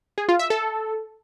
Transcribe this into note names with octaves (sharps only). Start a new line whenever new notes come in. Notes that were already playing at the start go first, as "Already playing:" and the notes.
G#4
F4
E5
A4